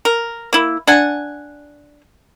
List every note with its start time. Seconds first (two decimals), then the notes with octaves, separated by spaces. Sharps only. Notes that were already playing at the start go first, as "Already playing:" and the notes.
0.05 A#4
0.53 A#3 E4
0.87 D4 F#5 G#5